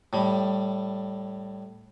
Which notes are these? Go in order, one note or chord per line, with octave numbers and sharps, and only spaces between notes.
A2 G3